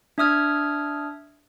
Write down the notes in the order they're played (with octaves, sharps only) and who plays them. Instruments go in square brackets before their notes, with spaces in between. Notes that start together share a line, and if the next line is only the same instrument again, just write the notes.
[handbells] D4 E5 D#6 F6 G#6